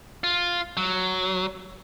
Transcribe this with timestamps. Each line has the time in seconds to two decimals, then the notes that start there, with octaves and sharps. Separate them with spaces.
0.24 F4
0.77 F#3